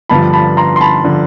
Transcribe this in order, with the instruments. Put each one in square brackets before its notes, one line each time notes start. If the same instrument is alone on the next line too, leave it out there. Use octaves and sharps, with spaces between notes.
[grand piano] G1 G2 D3 F3 A5 B5
A5 B5
A#5 C6
C6
A5 B5
D3 F3